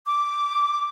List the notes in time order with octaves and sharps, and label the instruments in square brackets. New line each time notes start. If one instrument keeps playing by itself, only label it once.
[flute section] D6